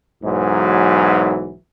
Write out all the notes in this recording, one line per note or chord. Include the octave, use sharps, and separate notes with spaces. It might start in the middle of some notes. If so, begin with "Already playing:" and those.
B1 G#2 E3 F#3